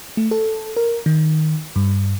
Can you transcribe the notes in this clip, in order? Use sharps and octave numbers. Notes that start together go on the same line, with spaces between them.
A3
A4
A#4
D#3
G2